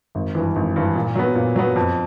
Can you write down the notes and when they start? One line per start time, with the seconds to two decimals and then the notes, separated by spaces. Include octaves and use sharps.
0.15 G#1
0.35 G2 E3
0.56 G#1
0.76 G2 E3
0.95 A#2
1.15 F#3 B3
1.35 A#2
1.56 F#3 B3
1.76 F2